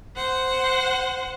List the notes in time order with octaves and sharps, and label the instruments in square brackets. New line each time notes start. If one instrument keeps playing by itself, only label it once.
[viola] C5 F#5